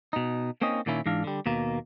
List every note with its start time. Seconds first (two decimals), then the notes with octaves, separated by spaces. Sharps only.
0.13 B2 D#4
0.62 A#3 C4 C#4 D#4 D#5
0.86 A#2 D#3 A#3 C#4 E4
1.06 G#2 E3 D4 F5
1.24 D3 G3
1.46 D#2 B2 A#3